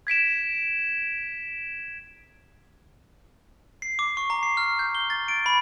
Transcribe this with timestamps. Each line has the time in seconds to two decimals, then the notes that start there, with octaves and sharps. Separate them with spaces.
0.07 G#6 B6 D7 E7
3.82 C7
3.99 D6
4.17 C#6
4.30 A#5
4.43 C7
4.57 F6
4.79 G6
4.95 G7
5.10 A6
5.28 D7
5.46 B5